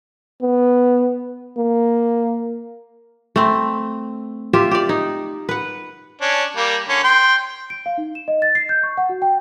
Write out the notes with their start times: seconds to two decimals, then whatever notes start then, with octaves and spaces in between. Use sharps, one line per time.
0.42 B3
1.58 A#3
3.36 A3 C4
4.53 F4 G4 E5
4.71 G4 D5
4.89 D#4
5.49 B4 F#5
6.21 C#4 D4
6.56 G3 A#3
6.88 D3 C#4
7.04 G5 C6
7.70 D7
7.86 F5
7.98 D#4
8.15 E7
8.28 D#5
8.42 A6
8.55 C7
8.69 G6
8.83 C#6
8.97 F#5
9.09 F#4
9.22 G5